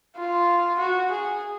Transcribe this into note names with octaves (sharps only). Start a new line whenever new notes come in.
F4
F#4
G#4